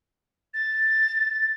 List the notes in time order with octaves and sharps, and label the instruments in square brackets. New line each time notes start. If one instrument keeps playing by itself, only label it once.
[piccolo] A6